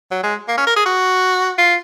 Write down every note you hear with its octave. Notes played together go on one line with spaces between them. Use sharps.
F#3
G#3
A#3
C#4
A#4
G#4
F#4
F4